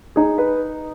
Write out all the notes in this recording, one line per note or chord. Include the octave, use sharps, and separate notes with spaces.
D#4 G#4
B4